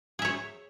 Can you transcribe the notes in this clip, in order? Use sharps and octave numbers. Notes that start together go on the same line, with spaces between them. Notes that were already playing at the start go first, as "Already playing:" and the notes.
G#4 C#5 E5